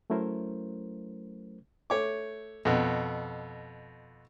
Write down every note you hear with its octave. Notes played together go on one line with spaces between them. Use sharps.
F#3 A3 C#4 E4 A#4 C5
A3 C#5 D6
F2 B2